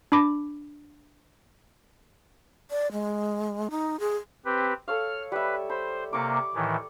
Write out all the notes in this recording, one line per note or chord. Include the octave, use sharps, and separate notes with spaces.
D4 B5 D6 A#6
D5
G#3
D#4
G#4
C4 G4 B4
A4 C#5 F5 F6
G3 B4 E5
C5 B5
C3 A#3 D5 C#6 D6
A2 D#3 E3